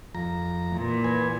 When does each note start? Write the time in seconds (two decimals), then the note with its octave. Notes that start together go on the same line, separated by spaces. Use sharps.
0.15 F2 A#5
0.67 A#2 E3
1.04 B4 G#5